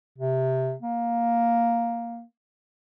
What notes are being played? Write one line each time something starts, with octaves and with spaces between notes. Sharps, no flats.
C3
A#3